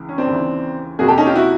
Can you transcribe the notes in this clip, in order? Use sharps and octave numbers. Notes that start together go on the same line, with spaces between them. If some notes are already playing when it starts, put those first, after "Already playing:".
Already playing: C#2 E3
C#4
C4 D4
D#2 C#3 E3
F2 C3 F3 A#3 F#4 G#4
G4 A4
C#4 D#4
F4 G4
E4 F#4